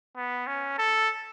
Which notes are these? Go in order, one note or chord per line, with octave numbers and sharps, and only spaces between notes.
B3
C#4
A4